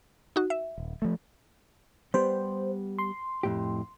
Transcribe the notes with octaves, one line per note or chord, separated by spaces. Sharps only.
D#4 F#4
E5
D#1
F3 A3
G3 B3 G4 C5
C6
F2 A2 G4